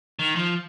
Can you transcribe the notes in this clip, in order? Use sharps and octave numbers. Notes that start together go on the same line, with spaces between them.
D#3
F3